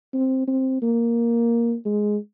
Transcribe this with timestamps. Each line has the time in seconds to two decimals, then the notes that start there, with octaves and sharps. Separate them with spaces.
0.14 C4
0.48 C4
0.82 A#3
1.86 G#3